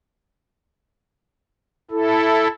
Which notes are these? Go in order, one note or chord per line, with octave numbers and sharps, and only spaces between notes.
E4 A4